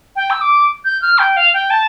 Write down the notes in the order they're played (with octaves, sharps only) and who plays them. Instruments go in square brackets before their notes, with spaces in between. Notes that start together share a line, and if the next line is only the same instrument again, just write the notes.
[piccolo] G5
E6
D6
G6
F6
G5
F5
G5
A5